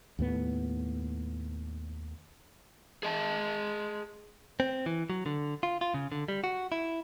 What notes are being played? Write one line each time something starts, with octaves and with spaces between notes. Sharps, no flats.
D#2 A2 B3
G#4 D#5 A5
C4
E3
F#3
D3
F4
F4
C#3
D3
G3
F#4
E4